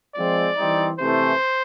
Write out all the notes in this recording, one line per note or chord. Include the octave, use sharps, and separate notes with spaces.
F3 G#3 C4 D5
E3 G3 C4 D#4
C3 E3 A3 C5